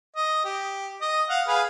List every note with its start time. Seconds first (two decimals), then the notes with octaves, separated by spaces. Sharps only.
0.16 D#5
0.45 G4
1.01 D#5
1.30 F5 F#5
1.48 G#4 B4 F5